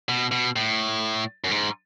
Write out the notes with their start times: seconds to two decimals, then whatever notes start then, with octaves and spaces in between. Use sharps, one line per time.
0.09 B2
0.32 B2
0.56 A2
1.44 F#2
1.51 G#2